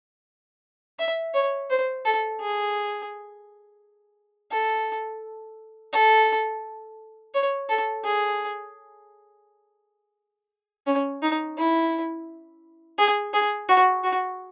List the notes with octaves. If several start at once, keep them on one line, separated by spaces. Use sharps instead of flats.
E5
C#5
C5
A4
G#4
A4
A4
C#5
A4
G#4
C#4
D#4
E4
G#4
G#4
F#4
F#4